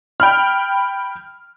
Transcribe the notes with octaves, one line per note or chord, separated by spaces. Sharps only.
G5 B5 F6